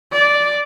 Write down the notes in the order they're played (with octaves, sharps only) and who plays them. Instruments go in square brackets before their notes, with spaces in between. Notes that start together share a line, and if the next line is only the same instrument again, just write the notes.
[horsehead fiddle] D5